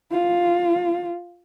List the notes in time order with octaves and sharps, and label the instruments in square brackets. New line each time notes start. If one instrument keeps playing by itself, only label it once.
[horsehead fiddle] F4